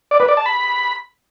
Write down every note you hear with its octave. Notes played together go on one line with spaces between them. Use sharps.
D5
B4
D5
A5
B5